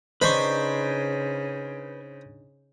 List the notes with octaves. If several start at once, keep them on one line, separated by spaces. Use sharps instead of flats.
C#3 D4 D#4 B4 C5 B5 C#6